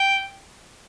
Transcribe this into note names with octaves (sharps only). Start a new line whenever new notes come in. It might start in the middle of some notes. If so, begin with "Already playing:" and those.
Already playing: G5